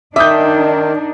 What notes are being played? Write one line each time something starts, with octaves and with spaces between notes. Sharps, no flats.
D#3 D4 D#4 E5 D6 D#6 G6